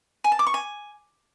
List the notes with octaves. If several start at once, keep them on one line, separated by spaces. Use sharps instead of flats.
G#5
A5
D6
C#6
G#5